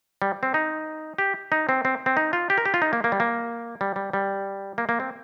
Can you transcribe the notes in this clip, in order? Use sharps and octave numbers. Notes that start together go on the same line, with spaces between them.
G3
C4
D#4
G4
D#4
C4
C4
C4
D#4
F4
G4
A#4
G4
F4
D#4
A#3
A#3
G3
A#3
G3
G3
G3
A#3
A#3
C4